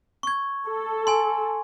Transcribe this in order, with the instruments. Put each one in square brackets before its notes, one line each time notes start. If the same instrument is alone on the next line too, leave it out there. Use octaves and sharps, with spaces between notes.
[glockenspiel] C#6 G#6
[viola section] A4
[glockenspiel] G#5 C6